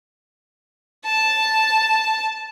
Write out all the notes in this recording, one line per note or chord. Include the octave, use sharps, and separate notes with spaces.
A5